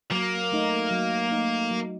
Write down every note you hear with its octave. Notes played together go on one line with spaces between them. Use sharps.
F#3 A#3
A3 D#4
F#3
A3 D#4
F#3